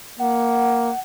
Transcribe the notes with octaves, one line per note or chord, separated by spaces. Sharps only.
A#3 F#5